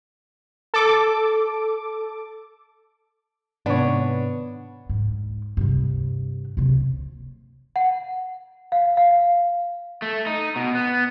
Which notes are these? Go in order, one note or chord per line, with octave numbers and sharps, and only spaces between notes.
A4 D6
G#2 C3 D#3 B3 D4 C#5
G#2
G2 C3
F#1 C3
F#5
F5
F5
A3
D#4
B2
B3